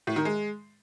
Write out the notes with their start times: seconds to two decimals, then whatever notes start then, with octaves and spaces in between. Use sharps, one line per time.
0.07 A2
0.16 D#3
0.25 G#3